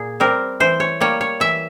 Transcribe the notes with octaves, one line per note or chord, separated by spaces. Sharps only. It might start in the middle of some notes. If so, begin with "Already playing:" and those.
Already playing: A#2 G#4
G3 C4 A#4
E3 C5
C#5
G3 A#3 C#5
C#5
E3 E5